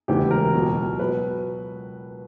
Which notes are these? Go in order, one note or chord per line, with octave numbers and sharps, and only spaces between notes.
E1 D2 C#3 E3 G4
A#4
C#2 B2 F#3
B2 F#3 B4